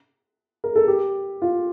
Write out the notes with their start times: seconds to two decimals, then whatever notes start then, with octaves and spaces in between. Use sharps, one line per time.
0.64 A#4
0.76 A4
0.88 G4
1.42 F4